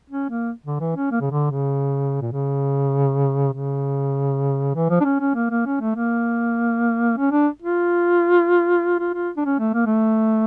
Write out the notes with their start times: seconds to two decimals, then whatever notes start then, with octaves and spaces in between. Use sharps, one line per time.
0.10 C#4
0.30 A#3
0.66 D3
0.80 E3
0.96 C#4
1.11 A#3
1.20 C#3
1.31 D3
1.51 C#3
2.21 A#2
2.32 C#3
3.53 C#3
4.75 E3
4.90 F3
5.01 D4
5.05 C#4
5.20 C#4
5.35 A#3
5.50 A#3
5.66 C#4
5.80 A3
5.96 A#3
7.17 C#4
7.32 D4
7.62 F4
8.99 F4
9.14 F4
9.37 D4
9.45 C#4
9.59 A3
9.74 A#3
9.86 A3